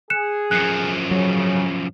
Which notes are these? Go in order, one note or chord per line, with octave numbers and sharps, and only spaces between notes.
G#4 F#6 C#7 E7
F#2 F3 F#6 C7 C#7
C#3 F#3